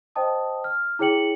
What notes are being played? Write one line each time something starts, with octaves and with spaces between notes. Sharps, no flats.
C5 D#5 G5 A5 D#6
F6
E4 G#4 C#5 G5 C#7 F#7